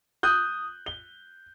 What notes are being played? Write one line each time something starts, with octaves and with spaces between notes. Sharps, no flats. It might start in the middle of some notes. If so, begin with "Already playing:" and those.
D#6 F#6 G6
G7